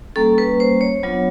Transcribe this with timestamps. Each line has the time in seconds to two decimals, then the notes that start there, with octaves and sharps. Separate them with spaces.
0.16 G3 A#3 C#4 A4
0.38 B4
0.60 C5
0.81 C#5
1.03 F#3 B3 D4 F4